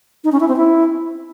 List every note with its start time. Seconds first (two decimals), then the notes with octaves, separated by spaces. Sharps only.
0.24 D#4
0.32 C#4
0.40 E4
0.48 C4
0.56 E4